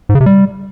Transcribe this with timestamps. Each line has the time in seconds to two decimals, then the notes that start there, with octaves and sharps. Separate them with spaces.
0.09 G#2
0.15 C#3
0.21 C3
0.26 G3